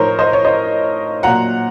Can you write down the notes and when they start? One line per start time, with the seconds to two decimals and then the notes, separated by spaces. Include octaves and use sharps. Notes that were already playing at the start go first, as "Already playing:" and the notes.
Already playing: A2 F3 D#4 A#4 C5 C#5
0.19 C5 D#5
0.33 C#5
0.45 C5 D#5
1.23 A#2 F#3 F#5 A#5